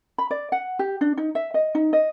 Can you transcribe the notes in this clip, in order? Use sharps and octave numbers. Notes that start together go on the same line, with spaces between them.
B5
D5
F#5
G4
D4
D#4
E5
D#5
D#4
D#5